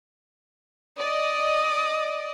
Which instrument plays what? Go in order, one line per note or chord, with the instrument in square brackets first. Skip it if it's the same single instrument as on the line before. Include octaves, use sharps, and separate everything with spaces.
[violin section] D5 D#5 [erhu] D#6